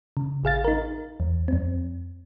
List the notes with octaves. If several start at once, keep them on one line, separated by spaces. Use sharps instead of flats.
C#3
A1 G#4 F5 A6
D#4 A#4
E2
F2 C4